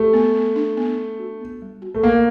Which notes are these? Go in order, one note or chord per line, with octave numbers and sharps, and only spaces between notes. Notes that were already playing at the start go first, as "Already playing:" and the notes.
Already playing: A3 G4
B3
B3
D4
B3
D4
F#4
B3
G3
F#4
A3
A#3 B3